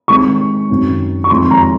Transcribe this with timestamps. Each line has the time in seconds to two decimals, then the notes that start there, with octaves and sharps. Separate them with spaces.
0.08 D#3 G#3 C4 C#6
0.69 F#2 D#3 F#3 C4
1.24 C#6
1.30 F2 D#3 G#3 C4 C6
1.51 A#5